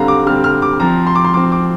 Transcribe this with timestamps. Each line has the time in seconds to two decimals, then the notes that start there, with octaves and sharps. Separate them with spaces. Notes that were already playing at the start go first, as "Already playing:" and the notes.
Already playing: D3 G3 C4 F5 A#5
0.08 D6
0.26 D3 G3 C4 F6
0.44 F6
0.62 D6
0.80 F3 C4 A#5
1.07 C6
1.15 D6
1.25 C6
1.34 F3 C4 D6
1.52 D6